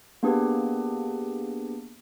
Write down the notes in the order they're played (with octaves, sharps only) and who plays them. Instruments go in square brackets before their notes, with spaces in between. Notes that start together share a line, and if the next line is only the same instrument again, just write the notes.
[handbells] A#3 B3 D4 G4 G#4 B4